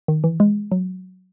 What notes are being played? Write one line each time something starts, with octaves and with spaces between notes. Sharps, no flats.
D#3
E3
G#3
F#3